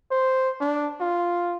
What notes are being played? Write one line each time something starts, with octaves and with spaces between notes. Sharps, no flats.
C5
D4
F4